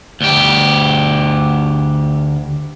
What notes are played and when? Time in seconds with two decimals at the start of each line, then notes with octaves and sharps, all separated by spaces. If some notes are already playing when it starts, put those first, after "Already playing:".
0.21 D2 G4